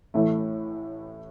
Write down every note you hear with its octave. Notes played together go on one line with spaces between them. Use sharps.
A1 A2 E3 A3 E4